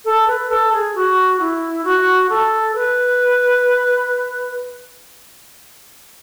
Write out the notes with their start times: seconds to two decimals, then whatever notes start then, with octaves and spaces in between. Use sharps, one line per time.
0.05 A4
0.27 B4
0.50 A4
0.72 G#4
0.95 F#4
1.40 E4
1.84 F#4
2.29 A4
2.75 B4